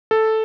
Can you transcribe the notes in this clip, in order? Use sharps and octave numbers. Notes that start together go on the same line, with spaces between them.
A4